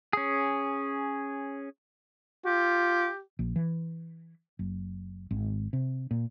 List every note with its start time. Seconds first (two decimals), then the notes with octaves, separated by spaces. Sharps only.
0.13 C#4 G#4
2.46 F4 G4
3.39 A#1
3.56 E3
4.59 F#1
5.31 G#1
5.73 C3
6.11 A#2